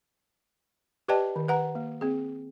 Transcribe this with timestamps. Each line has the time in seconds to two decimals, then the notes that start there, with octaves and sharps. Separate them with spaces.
1.08 G4 B4 D5 D#5 G5 A5
1.36 D#3
1.48 B4 F#5 A#5
1.75 A#3
2.01 C4 G#4